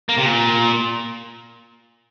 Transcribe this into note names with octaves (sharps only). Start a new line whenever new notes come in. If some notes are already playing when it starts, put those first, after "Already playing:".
A#3
C3
A#2